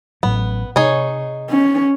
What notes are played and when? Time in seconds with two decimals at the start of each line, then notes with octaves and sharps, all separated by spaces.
0.23 A1 A2 F#3 B3
0.76 C3 D#4 G#4 C#5
1.50 C#4